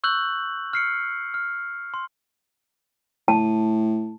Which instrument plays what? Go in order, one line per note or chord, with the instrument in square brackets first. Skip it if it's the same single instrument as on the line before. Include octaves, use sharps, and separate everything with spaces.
[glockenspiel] C#6 E6 F#6 G6 F#7
F6 C7 C#7
F6
C6
[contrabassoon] A2 [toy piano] A5